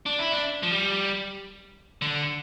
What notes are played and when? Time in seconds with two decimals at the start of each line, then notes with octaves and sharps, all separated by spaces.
0.06 D4
0.19 E4
0.32 D4
0.63 F3
0.71 G3
2.02 D3